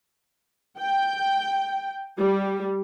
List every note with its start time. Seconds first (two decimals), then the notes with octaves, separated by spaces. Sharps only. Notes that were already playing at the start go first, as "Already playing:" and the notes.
0.79 G5
2.18 G3